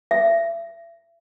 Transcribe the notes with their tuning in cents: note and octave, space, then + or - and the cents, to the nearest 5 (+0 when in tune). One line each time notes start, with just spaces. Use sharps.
E5 +35